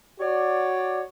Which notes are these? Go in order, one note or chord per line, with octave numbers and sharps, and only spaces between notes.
F#4 C#5 D5